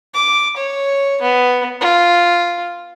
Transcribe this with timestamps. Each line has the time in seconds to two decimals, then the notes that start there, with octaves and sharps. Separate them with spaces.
0.14 D6
0.57 C#5
1.22 B3
1.81 F4